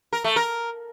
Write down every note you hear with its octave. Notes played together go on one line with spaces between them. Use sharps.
A#4
A3
A#4